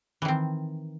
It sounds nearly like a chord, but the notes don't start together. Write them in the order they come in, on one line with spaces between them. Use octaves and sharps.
E3 D#3 C4